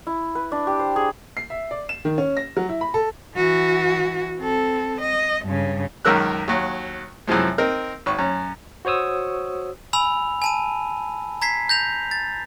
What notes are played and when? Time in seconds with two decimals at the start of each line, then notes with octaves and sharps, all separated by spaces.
0.07 E4
0.35 B4
0.52 D4
0.67 G4
0.79 C5
0.96 G#4
1.37 C7
1.50 E5
1.71 D5
1.89 E7
2.05 D#3
2.18 C#4
2.37 A#6
2.57 F#3
2.69 E4
2.81 B5
2.94 A4
3.35 E3 F#4
4.38 C4 A4
5.01 D#5
5.45 G2 C#3
6.05 C#2 F#2 D#3 A#4 E6 F#6
6.48 D#2 F#3
7.28 F#2 C3 E3 F3 G#3
7.58 C4 D#4 A#4
8.06 G#1 C#6
8.19 F#2 C#4
8.85 F#4 C5 C#5 D#6 E6
9.93 G#5 B5 E6 F7
10.42 G#5 A5 D#7
11.42 A#5 G#6 B6 C7
11.69 G6 A#6 F7
12.11 A6